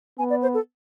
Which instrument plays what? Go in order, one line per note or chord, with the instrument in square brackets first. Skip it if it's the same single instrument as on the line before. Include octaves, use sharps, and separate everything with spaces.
[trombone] B3 [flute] G#5
[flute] D5
C5
A4